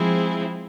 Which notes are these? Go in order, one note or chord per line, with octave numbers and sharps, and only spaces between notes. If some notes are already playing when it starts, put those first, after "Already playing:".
Already playing: F3 G#3 C4 E4 G#4